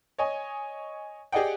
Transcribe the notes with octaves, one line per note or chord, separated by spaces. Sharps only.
C#5 D#5 G#5
G4 G#4 D5 D#5 F#5 G5